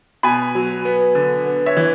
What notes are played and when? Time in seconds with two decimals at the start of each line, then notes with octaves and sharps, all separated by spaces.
0.23 B2 G#5 B5
0.55 F#3
0.85 B3
1.15 D3
1.46 B3
1.66 C#5 E5
1.77 E3